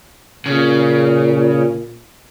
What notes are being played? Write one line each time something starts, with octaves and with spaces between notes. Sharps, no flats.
A#2 C#3